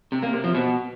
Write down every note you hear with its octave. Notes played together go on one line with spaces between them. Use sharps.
C3
A#3
C3
F3
B2